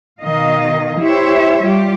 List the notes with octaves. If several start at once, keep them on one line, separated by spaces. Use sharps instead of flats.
B2 D#3 D#5 F5
E4 G4 C5 C#5 E5
G3 F4 G4